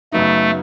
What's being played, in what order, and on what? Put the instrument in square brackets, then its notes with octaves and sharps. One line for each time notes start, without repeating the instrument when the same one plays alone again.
[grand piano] F#2 C#3 F#3 B3 D#4 [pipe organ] A3